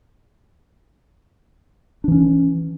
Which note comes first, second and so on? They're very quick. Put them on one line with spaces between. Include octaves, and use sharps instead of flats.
D4 E3 C#4